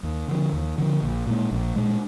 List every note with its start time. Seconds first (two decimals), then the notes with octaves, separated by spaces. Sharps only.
0.03 D#2
0.28 D3 F3
0.53 D#2
0.78 D3 F3
1.02 A#1
1.27 A#2 G#3
1.51 A#1
1.76 A#2 G#3